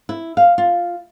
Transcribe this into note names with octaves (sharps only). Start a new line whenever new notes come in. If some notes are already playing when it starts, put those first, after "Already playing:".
E4
F5
F4